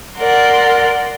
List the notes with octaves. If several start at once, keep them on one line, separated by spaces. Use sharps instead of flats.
A#4 D5 F#5 C6